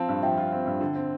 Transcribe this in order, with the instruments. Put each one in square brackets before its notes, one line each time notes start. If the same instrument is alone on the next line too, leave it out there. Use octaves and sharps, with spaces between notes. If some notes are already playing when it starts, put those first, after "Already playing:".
Already playing: [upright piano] F3 C4 F4 [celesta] F5 A5
[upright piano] G2
[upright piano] F3 [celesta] E5 G5
[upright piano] F4
C4
G2
D3
C4